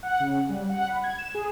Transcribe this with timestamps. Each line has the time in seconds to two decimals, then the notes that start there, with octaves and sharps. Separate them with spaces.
0.03 F#5
0.20 C#3
0.49 G3
0.69 F#5
0.88 B5
1.04 G#6
1.19 E7
1.35 G#4